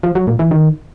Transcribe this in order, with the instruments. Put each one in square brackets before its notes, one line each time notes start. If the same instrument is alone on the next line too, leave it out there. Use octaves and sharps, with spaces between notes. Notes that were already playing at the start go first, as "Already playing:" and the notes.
[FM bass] F3
F#3
A#2
E3
D#3